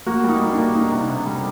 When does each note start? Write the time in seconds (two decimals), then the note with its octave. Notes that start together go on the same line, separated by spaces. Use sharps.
0.06 A#3 F#4
0.24 G3
0.29 D#4
0.41 A#3
0.52 D4
0.57 A#3
0.75 A#3 D#4
0.92 C3
1.09 C3
1.26 G3